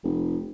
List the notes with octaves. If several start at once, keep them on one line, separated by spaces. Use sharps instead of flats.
F1